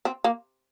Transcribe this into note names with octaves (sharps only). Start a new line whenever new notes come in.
C4
A#3